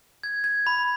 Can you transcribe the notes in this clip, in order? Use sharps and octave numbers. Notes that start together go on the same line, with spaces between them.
G#6
G#6
B5